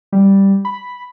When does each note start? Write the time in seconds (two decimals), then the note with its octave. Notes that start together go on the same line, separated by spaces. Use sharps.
0.12 G3
0.65 B5